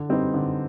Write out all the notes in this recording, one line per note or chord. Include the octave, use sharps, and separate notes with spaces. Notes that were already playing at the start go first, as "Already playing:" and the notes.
Already playing: D3
G3 C4 D#4 B4
D3